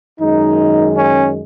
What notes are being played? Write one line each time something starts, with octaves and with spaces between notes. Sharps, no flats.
F#2 D#3 G#3 D#4
C#4